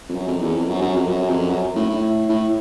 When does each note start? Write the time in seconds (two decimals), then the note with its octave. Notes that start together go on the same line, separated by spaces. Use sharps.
0.09 F2
0.15 F#2
0.28 F2
0.41 E2
0.55 F2
0.68 F#2
0.81 F#2
0.96 F2
1.09 F#2
1.29 F2
1.50 F#2
1.76 A2
1.90 A2
2.29 A2